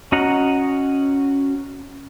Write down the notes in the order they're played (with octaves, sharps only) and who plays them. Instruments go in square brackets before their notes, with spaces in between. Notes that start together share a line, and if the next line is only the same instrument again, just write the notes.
[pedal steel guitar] C#4 F#4 D#5 F#5 A#5